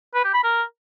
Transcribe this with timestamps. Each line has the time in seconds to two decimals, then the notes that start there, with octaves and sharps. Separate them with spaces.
0.14 B4
0.24 G4
0.34 B5
0.44 A#4